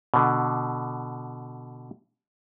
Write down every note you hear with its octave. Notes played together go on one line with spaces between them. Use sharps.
B2 D3